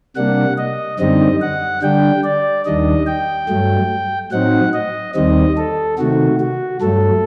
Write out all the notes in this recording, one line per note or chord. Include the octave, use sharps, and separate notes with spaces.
C3 G3 A#3 D4 F#5
D#5
F#2 D3 G3 C4 D#4 D#5
F#5
D3 G3 D4 G5
D5
D#2 D#3 G3 D4 D#5
G5
G2 F#3 A3
A2 F#3 C4 D#4 F#5
D#5
D#2 D#3 G3 C4 D#5
A4
C3 D#3 A3 F#4
F#4
G2 F#3 A3 A4